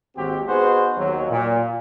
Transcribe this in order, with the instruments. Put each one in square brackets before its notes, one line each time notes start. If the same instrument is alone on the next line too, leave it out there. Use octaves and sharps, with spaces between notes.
[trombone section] G#1 D#2 C4 F#4 G4
B3 D#4 F#4 G#4 B4 C5
D#2 F#3
A#2